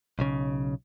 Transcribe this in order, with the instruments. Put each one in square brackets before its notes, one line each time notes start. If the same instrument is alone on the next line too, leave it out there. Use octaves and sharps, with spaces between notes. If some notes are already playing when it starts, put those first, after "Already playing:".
[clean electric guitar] B1 C#3